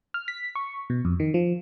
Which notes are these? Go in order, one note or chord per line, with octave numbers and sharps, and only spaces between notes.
F6
B6
C#6
B2
F2
D#3
F3